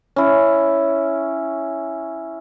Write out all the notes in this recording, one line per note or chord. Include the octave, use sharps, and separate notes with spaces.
C#4 E4